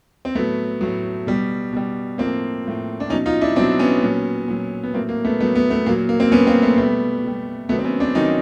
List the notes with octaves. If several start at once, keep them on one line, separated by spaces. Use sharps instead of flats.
C4
A2 F#3 A3 B3
A2 F#3
B2 G3
B2 G3
A2 F3 A#3 C4
A2 F3
D4
B2 F#3 C#4 D#4
D#4 F4
D4 E4
B2 F#3 C4 D4
B3 C#4
A#2 F#3
A#2 F#3
B3
A2 F#3 A#3 C4
A#3
A3 B3
A2 F#3 A3 B3
A3 B3
A3 B3
A#2 F#3 A#3
A#3
A#3 C4
A#2 F#3 B3 C#4
A#3 C4
A3 B3
B2 G3 A3 B3
B2 G3
C3 D#3 F#3 A3 B3
C4
B3 C#4
C4 D4
C3 D#3 F#3 C#4 D#4